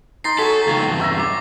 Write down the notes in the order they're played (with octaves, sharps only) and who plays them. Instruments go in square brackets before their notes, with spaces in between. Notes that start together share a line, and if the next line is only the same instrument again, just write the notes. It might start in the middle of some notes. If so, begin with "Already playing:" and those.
[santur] D#4 C6 [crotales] A6 A#6 C7
[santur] F#3 G#5 [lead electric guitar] A4 [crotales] C#6 B6
[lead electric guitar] C#2 D#3
E2 G2
[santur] E5 A#5
[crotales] D6